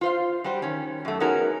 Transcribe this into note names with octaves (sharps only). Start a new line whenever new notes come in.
F4 C5 F5
G3 F#4 G4 C5
D#3 C#4
F#2 A3
B3 C#4 D#4 F#4 G#4 A#4